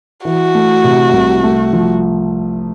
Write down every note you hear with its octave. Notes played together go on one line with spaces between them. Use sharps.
E3 F#4
A3
C3
C2
A3
F3